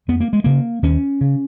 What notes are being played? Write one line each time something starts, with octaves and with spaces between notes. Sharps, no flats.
F2 B3
A#3
G#3
C#3 A#3
D#2 C#4
C#3